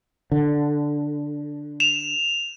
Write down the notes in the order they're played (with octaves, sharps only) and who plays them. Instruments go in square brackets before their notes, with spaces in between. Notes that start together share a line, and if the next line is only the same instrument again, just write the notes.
[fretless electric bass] D3
[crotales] E7 F7